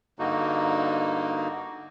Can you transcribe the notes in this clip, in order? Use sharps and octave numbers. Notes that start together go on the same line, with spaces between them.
G2 D3 A#3 D#4 F#4